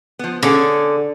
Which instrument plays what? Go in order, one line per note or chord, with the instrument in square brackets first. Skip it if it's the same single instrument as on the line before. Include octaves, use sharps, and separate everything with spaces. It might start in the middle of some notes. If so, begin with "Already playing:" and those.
[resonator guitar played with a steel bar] F3 B3
[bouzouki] D3 [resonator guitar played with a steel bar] C#4 G#4